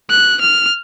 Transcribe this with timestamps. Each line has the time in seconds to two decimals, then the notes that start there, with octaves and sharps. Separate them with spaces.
0.10 F#6
0.41 F6